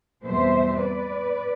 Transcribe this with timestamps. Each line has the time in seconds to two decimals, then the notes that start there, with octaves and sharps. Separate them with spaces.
0.25 E2 B2 G3 C4 C5 E5
0.78 B4 D5